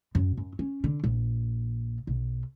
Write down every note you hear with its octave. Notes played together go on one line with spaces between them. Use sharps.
F#2
F#2
C#4
D3
A#1
B1